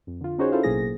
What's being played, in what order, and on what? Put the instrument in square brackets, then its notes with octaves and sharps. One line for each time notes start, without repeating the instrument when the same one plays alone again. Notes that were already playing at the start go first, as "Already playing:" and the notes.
[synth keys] F2
D3 F4
C#4 D#4 F#4 G#4 C5 C#5
C#4 E4 F4 A4 C5 F5
A1 B2 F#3 A#3 G#4 A#6